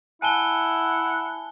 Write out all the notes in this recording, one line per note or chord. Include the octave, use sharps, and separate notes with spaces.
E4 F#5 G#5 A5 G7